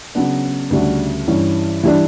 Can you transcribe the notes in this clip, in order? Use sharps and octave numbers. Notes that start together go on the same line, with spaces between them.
C#3 F#3 B3 D4
D2 C#3 G3 D4 F#4
G2 E3 G3 C#4 E4
E3 G3 D4